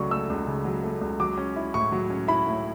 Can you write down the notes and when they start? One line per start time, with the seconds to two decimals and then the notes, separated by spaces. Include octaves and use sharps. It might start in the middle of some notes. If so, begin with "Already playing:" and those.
Already playing: C#2 C#3 F#3 A3 D5 C#6
0.11 A3 E6
0.30 C#2
0.47 C#3
0.65 F#3
0.84 A3
1.01 C#2
1.20 F#3 D6
1.38 C#4
1.56 E4
1.74 A2 C#6
1.92 F#3
2.10 C#4
2.28 E4 B5
2.47 A2